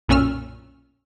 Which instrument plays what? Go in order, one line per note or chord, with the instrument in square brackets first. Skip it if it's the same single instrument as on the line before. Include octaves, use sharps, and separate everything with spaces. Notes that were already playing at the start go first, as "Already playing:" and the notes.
[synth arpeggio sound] B1 F#2 A#2 C#4 E6 F6